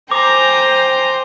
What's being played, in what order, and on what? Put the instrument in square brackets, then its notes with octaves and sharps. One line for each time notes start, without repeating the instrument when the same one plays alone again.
[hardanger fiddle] C5 [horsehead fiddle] G5 G#5 [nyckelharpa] A#5 [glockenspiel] D6